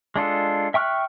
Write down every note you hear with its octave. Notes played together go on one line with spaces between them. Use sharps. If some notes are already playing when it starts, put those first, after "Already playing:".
G#3 D4 F4 A4
E5 G5 C#6 F6 F#6